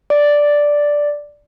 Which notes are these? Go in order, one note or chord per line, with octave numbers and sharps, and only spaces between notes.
D5